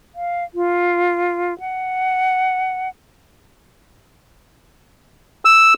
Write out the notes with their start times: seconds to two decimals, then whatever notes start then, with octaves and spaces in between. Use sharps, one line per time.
0.15 F5
0.55 F4
1.60 F#5
5.45 E6